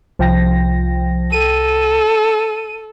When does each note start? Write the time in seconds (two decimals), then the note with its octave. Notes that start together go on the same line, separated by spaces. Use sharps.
0.19 C2 F3 G5 A#6
1.32 A4 D#7